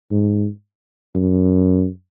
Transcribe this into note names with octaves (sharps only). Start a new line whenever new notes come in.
G#2
F#2